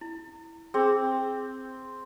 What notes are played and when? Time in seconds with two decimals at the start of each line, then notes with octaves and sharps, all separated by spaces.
0.01 E4
0.74 C4 G#4